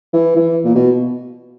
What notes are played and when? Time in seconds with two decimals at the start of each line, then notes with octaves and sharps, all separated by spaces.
0.13 E3
0.36 E3
0.65 A#2
0.75 B2